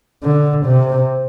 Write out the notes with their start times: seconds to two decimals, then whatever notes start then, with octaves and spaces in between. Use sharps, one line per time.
0.24 D3
0.66 C3